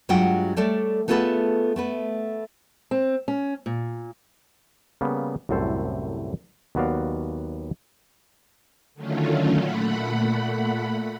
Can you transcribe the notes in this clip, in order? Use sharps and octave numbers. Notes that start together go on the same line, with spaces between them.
G2 F#3 G#3 F4 F#5 G5
G3 A3 A4 C#5 D5
A3 B3 F4 G#4 A4 B4
A3 B3 B4
C4
C#4
A#2
C#3 G3 A#3 B3
C2 F#2 A2 A4 C5
D#2 F#3 B3 F#4 D5 F5
D3 D#3 F#3 A3 C#4 F4
A#2 A3 F#5 B5